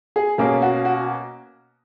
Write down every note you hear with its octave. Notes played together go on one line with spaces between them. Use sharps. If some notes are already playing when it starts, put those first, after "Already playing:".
G#4
B2 A#3 C#4 G#4
F#4
F#4